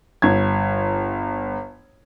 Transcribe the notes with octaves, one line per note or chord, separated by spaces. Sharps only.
G1 G#6